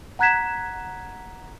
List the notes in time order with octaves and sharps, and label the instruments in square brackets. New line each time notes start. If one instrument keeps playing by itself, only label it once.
[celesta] F#5 A#5 F#6 G#6 B6 E7